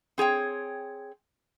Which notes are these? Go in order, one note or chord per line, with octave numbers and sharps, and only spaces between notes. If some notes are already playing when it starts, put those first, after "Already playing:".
C4 G#4 C#5 G5